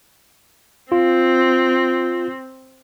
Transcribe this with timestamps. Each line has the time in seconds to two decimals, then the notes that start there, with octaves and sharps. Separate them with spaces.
0.92 C4 F4